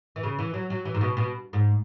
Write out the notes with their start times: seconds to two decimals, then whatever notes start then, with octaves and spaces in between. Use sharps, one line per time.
0.16 E3
0.23 C#3
0.39 E3
0.54 F#3
0.70 F#3
0.85 E3
0.95 G#2
1.01 B2
1.17 B2
1.53 G#2